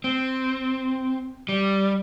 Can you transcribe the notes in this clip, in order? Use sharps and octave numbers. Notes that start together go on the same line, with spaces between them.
C4
G3